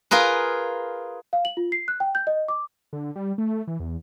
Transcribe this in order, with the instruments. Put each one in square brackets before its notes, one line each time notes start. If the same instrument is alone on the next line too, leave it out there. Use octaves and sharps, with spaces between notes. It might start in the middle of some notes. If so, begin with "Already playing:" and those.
[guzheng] F4 G#4 A#4 B4
[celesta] F5
F#7
F4
C7
F#6
G5
G6
D#5
D6
[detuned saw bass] D3
G3
A3
E3
E2